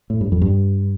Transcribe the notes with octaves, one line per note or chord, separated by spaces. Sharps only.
A2
G2
F2
G2